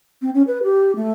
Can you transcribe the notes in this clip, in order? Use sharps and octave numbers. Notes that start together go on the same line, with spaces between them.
C4
C#4
B4
G4
A3